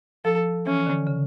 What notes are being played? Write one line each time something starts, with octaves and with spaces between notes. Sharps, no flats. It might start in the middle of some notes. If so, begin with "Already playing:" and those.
F3 A4
E3 C#4
D3
C#3